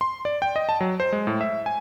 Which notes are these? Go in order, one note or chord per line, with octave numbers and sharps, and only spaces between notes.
C6
D5
G5
D#5
A5
F#3
C5
G#3
A2
E5
G#5